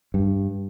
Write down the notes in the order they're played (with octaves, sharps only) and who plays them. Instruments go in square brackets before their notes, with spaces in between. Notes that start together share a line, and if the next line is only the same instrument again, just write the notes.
[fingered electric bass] G2